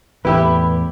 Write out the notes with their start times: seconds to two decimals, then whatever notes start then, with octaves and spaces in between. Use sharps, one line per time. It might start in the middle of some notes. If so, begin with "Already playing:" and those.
0.25 E2 A2 E4 G4 B4 E5 B5